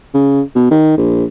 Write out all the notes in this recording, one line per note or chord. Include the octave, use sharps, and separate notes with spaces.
C#3
B2
D#3
A#1